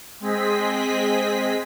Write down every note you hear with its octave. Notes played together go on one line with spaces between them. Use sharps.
G#3 C4 G#4 D#5 B6